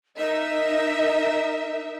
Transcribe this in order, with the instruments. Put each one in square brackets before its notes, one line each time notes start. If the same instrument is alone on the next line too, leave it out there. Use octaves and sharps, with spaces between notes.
[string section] D#4 A#4 E5 [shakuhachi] D#5